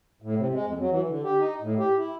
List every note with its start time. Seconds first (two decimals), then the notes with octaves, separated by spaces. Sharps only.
0.22 A2
0.37 C3
0.52 G#3
0.66 F2
0.79 F#3
0.91 E3
1.08 D3
1.23 G4
1.39 D#4
1.61 A2
1.79 G4
1.97 E4